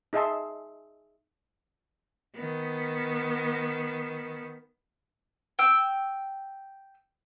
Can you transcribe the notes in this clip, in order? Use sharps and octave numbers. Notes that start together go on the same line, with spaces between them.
D#4 G#4 D#5 E5 A5 C6
D#3 B3
G5 E6